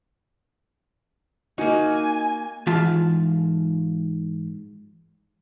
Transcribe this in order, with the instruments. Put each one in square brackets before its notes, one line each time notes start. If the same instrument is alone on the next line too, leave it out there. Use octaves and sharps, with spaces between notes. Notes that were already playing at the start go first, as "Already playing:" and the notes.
[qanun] A#3 F#4 [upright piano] D#4 [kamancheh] G#5
[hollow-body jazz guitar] G#2 E3 F4 E5 A5